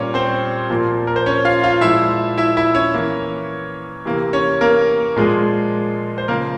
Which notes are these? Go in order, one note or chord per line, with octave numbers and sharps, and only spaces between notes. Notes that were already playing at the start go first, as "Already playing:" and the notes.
Already playing: A#2 G3 A#3 C#4 C#5
C4 C5
A#2 F3 A#3
A#4
C5
C#4 C#5
F4 F5
F4 F5
A#2 F3 G#3 E4 E5
E4 E5
E4 E5
C#4 C#5
E3 A#3
C3 E3 A#3
C#4 C#5
A#3 A#4
A#2 F3 G#3 G#4
C5
C#3 F3 A#3 A#4